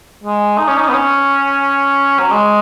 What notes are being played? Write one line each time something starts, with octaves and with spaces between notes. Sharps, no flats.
G#3
D#4
C#4
D#4
B3
C#4
F#3
G#3